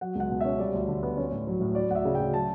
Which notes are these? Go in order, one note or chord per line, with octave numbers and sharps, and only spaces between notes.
F#3 F#5
C#2 F#5
B2
C#4 E5
G3 D5
D2
D3
B3
C#4
A2
F#3
A2
F#3 D5
D2 F#5
E5
C#3
G5
D2
F#3 A5